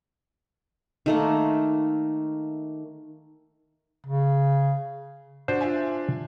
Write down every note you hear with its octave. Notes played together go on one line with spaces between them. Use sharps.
D#3 A3 A#3
C#3
D4 F#4 C5
F4 E5 G#5